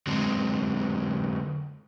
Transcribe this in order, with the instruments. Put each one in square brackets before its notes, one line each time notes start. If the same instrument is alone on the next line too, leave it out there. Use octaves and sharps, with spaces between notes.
[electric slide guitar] D3 F#3 G#3 C4